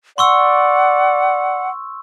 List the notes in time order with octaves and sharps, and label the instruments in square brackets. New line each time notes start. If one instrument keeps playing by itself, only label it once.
[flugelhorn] D5 [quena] F#5 [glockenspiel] C6 C#6 E6